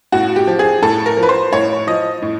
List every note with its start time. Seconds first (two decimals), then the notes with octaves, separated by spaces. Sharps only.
0.12 A2 F#4
0.36 G4
0.47 F3
0.59 G#4
0.82 A2 A4
1.06 A#4
1.17 F3
1.23 B4
1.29 C5
1.52 A2 C#5
1.87 F3 D#5
2.22 A2